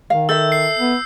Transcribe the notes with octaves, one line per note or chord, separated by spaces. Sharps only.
D#3 F5
A4 E5 E6 G6
C7
B3